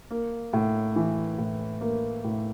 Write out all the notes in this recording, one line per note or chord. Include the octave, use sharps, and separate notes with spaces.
A#3
A2
E3
A2
A#3
A2